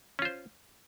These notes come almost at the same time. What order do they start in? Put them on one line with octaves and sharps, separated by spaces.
C#4 F4 C5